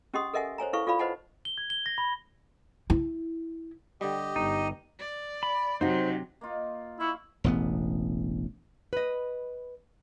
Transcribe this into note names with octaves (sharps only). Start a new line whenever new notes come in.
C#4 G4 D#5 F#5 C6 D#6
A4 A#4 D#5 E5 F#5 G#5
C5 C#5 G#5 A#5
E4 A4 B4 F5 C#6
F4 A4 D5 F5 B5
B4 C5 D#5 F#5 A5
G7
G#6
G7
A#6
B5
E4
D3 G3 G4 D#5
G1 D#4
D5
B5
C3 F#3 D#4 F#4 C5
A#3 D#4 F4
E4 E5 F5 C#6
E1 A1 B3
B4 D#5